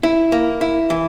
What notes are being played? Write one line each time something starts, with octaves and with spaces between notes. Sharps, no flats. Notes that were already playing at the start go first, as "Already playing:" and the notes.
E4
A#3
E4
E3